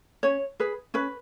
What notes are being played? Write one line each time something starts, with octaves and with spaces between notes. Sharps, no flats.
C#4 C#5
G#4 B4
C#4 B4